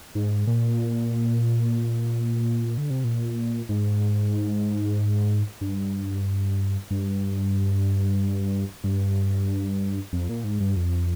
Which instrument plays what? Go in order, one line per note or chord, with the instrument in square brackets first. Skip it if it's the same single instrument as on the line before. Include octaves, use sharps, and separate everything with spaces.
[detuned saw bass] G#2
A#2
D3
C3
A#2
G#2
G2
G2
G2
F2
A#2
G#2
G2
F2